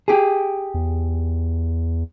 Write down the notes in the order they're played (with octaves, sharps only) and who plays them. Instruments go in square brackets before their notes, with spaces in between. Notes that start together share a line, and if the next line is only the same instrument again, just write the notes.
[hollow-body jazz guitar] G4 G#4
[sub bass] E2